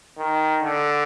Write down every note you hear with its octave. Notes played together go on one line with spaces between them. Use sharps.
D#3
D3